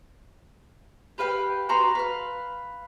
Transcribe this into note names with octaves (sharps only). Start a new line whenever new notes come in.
G4 B4 F5 G5
F#4 B4 A#5 C6
B4 F5